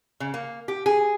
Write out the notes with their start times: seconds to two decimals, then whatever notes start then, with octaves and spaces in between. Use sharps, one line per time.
0.20 C#3
0.34 A#3
0.68 G4
0.86 G#4